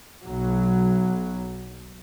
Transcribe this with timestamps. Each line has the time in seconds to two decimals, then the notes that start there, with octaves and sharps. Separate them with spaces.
0.24 B1 F#3